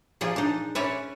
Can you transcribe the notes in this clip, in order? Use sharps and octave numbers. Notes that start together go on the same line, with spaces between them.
A#2 F3 G#4 D5 E5
D4 D#4
C#4 B4 C#5 D5 E5 G#5